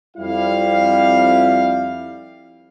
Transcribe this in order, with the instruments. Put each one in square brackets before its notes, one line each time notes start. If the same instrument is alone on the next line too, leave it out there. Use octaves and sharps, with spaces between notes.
[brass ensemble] F2 G3 E4 F5